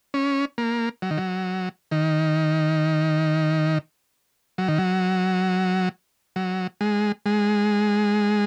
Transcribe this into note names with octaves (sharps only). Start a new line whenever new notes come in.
C#4
A#3
F#3
D#3
F#3
D#3
F#3
D#3
F#3
F#3
G#3
G#3